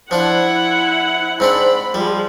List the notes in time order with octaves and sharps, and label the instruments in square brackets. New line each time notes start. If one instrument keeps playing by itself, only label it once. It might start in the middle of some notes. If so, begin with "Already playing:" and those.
[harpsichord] F3 D4 [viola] E4 F#5
[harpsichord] G#2 C4 D4 [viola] B5
[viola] F3 G#3 [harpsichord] G3